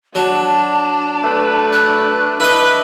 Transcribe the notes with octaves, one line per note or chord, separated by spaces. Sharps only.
F#3 D4 A5
A3 B4
F#6
D4 E4 B4 D#5